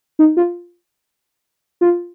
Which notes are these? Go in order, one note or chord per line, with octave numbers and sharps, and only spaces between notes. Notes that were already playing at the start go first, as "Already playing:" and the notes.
D#4
F4
F4